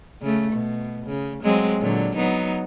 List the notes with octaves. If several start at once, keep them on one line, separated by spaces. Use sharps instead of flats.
C#3 A3
B2
C#3
F#3 G#3 C4
A#2 D3 F#3
F#3 B3 D#4